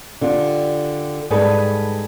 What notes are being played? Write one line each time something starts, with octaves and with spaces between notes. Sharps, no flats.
D3 F4 G4
G#2 G3 G#4 A4 B4 A5